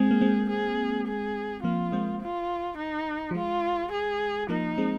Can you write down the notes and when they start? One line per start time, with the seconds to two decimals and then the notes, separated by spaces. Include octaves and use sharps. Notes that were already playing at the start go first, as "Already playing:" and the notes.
Already playing: G#3 C4 G#4
0.11 A#3
0.21 G#3 C4
0.49 G#4
1.07 G#4
1.64 F3 A#3 F4
1.92 G#3 C4
2.21 F4
2.78 D#4
3.31 F3
3.35 G#3 F4
3.92 G#4
4.49 F3 A#3 D#4
4.78 G#3 C4